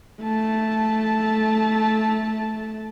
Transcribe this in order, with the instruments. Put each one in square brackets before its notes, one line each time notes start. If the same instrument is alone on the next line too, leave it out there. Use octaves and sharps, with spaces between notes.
[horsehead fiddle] A3 A5